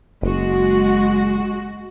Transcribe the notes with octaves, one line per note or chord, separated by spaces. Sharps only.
F#1 G#3 F#4